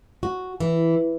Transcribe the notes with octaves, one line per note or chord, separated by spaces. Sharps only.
F#4
E3